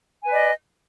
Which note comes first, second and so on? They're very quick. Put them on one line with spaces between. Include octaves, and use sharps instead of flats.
G#5 B4 D5 D#5